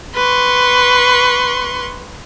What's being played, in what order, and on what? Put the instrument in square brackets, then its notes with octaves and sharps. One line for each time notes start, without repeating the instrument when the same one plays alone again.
[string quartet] B4 C6 C#6